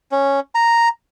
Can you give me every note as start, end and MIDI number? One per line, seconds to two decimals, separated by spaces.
0.12 0.40 61
0.55 0.89 82